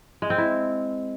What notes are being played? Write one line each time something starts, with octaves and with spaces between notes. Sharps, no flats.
G#3
C4
E4